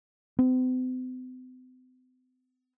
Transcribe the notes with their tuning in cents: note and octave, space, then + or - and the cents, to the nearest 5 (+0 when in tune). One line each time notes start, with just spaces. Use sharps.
C4 -45